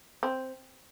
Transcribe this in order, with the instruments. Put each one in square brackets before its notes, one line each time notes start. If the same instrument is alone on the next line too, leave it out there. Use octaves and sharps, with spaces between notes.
[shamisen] C4